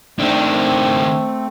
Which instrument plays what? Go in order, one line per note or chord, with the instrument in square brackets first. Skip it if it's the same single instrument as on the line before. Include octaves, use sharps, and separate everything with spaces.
[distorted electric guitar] D#3 D4 [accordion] A3 C4